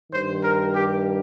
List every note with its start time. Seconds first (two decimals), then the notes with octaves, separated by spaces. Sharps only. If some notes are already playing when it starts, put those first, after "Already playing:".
0.11 G2 D#3 C5
0.42 A#4
0.74 G4